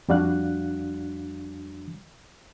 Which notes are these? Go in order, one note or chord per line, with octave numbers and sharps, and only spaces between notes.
F2 G3 D4 F#4 F5 F#6